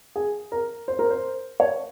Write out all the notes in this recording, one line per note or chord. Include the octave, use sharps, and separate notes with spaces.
G#4
A#4
C5
A#4
C5
C#5